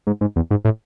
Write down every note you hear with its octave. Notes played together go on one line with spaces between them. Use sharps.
G#2
G#2
E2
G#2
A2